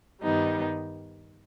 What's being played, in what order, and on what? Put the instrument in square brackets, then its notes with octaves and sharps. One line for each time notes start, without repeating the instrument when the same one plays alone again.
[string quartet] G2 D#3 G3 B3 D#4